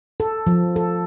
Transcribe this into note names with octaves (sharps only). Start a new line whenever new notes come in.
A4
F3
A4